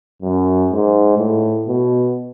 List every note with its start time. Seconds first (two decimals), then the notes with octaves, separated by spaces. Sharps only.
0.22 F#2
0.71 G#2
1.19 A2
1.67 B2